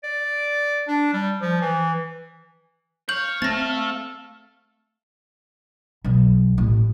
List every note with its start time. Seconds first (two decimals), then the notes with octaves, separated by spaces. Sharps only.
0.04 D5
0.88 D4
1.13 G3
1.42 F3
1.61 E3
3.09 C#5 F5 G6 F#7
3.42 A3 C4 A4 A6 A#6
6.04 B1
6.58 A1